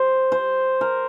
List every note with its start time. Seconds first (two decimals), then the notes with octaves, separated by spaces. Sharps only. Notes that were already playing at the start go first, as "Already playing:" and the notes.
Already playing: C5
0.32 C5
0.81 A#4